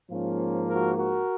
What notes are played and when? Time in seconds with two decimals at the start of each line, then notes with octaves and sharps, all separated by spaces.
0.11 G#2 F3 A#3 C#4 F4
0.68 F#4 A#4
0.96 F#4 A#4